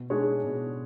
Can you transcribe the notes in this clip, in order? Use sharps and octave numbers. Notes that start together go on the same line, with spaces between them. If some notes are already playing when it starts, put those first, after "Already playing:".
Already playing: B2
G#3 D4 G#4 C#5
B2